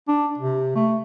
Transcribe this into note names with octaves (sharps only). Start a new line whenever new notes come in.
D4
C3
A3